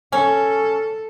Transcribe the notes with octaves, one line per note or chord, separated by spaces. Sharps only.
C#4 A4